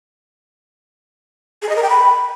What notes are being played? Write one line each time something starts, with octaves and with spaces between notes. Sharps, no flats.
G#4
D#5
A#4
G5
B5